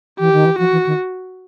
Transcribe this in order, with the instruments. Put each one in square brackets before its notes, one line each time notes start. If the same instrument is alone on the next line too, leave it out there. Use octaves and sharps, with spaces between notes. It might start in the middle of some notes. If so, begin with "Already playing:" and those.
[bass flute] E3 [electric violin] G4
[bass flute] D#3
E3
[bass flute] F3 [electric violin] F#4
[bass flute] E3
D#3